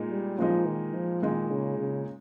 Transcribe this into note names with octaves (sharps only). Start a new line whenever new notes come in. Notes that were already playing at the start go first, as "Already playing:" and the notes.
Already playing: A#2 G#3 D#4
G3
A#2 F3 G#3 D#4
D#3
F3
A#2 D#3 G#3 D#4
C#3
C#3